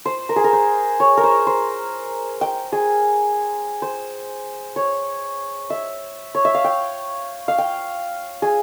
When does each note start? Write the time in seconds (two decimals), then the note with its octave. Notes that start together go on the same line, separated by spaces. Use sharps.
0.06 C5
0.29 A#4
0.36 G#4
0.44 A#4
0.53 C5
1.00 C#5
1.17 A#4
1.24 C5
1.47 C5
2.41 G5
2.72 G#4
3.82 C5
4.76 C#5
5.70 E5
6.35 C#5
6.45 E5
6.54 F5
6.64 G5
7.48 F5
7.58 G5
8.42 G#4